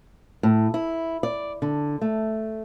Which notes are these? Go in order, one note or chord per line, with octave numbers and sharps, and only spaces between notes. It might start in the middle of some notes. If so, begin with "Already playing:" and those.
A2
E4
D5
D3
A3